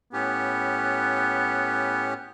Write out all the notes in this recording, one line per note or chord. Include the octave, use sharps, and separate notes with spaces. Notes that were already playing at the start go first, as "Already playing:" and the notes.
A2 B3 C#4 G4